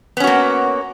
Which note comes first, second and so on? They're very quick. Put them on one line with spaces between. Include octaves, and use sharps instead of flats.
B3 C#4 F#4 A#3